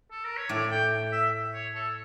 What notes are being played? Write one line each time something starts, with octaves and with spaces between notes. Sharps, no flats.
A4
A#4
C#5
A2 D5
G5
E5
C#5
A4